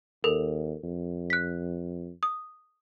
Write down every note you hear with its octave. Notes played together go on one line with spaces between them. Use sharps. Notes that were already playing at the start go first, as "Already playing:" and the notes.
D#2 A4 A#4
F2
F#6 B6
D#6